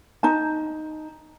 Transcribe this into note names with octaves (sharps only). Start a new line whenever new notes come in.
D#4 A5